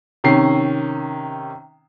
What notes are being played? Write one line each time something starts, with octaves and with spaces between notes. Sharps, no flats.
C3 D#3 C#4 C7